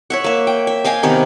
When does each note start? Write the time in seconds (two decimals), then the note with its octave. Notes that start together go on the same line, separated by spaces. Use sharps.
0.10 C#5 E5 F#5
0.24 A#3 E5
0.47 G5
0.67 E5
0.84 D#5 F5 G5 G#5
1.03 C3 D#3 B3 D#4